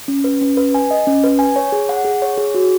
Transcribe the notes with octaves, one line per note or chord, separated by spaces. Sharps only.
C#4
B4
C#4
B4
G#5
D#5
C#4
B4
G#5
C#5
G#4
F#5
G#4
C#5
G#4
F#4